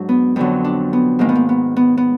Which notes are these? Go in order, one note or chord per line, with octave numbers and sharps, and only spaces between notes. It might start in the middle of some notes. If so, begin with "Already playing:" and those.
Already playing: G#2 F#3 D4
B3
F2 D3 F#3 B3
D4
B3
G#2 D#3 G#3 A#3
B3
A#3
B3
B3
B3